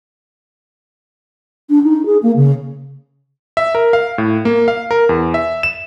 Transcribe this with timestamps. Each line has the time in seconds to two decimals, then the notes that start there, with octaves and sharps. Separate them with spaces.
1.70 D4
1.84 D#4
2.05 G#4
2.23 A#3
2.36 C#3
3.57 E5
3.75 A#4
3.93 F5
4.18 A2
4.45 A#3
4.68 F5
4.91 A#4
5.09 E2
5.34 E5
5.63 E7